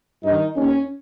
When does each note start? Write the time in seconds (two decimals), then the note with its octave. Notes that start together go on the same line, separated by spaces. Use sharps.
0.24 G2 D#4
0.29 D#3
0.56 D#2 D#3 C#4